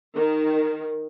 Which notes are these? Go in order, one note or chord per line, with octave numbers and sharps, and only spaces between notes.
D#3